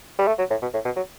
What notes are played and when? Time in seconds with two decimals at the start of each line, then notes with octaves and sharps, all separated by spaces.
0.19 G3
0.28 A3
0.39 F#3
0.51 A2
0.62 B2
0.74 A2
0.85 B2
0.96 F#3